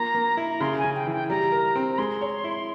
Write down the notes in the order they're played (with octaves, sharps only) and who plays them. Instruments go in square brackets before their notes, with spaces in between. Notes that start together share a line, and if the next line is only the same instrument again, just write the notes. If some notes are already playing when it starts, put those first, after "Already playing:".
Already playing: [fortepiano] A#3 F4 [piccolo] A#5
[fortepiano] A#3
E4
[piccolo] A#5
[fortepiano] C#3 [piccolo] C6
[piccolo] G#5
[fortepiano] C#3
[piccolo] G5
[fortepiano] E3
[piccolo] G5
[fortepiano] G3 [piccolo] A#5
[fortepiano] A#4
C4
[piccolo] A#5
[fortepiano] G#3 [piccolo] C6
[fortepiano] C#5
E4